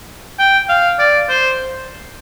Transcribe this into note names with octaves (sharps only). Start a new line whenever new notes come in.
G5
F5
D5
C5